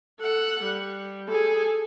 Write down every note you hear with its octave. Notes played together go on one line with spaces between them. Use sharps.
A4 F#5
G3
G#4 A4